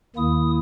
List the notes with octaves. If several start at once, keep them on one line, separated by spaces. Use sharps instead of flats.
D#2 D#3 A#3 E4 D#6